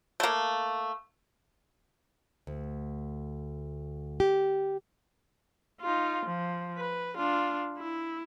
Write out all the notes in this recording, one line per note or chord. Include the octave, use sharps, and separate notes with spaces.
A3 A#3
D2
G4
D#4 F4
F3
B4
D4 F4
E4